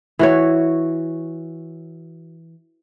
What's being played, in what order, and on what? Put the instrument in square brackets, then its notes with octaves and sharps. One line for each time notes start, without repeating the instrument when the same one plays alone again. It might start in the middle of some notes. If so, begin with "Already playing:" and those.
[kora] E3 F#4 C#5